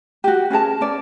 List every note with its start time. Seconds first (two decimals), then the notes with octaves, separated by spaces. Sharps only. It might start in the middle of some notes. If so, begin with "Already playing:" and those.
0.24 F#4 G4
0.50 C#4 G#4 A#4 A5
0.81 C#4 D5